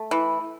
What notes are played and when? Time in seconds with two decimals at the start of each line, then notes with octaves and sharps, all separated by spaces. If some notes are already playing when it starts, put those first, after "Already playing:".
Already playing: A3
0.11 E3